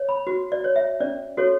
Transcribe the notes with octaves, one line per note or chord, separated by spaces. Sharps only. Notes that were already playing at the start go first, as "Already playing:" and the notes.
Already playing: C#5
B5
F#4
D5
C#5
E5
C#4 D5
F#4 A4 C#5